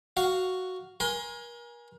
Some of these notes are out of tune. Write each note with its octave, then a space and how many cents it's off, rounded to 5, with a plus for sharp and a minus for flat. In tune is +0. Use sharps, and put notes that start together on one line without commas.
F#4 +0 F5 +0
A#4 +35 G#5 -5 C6 +0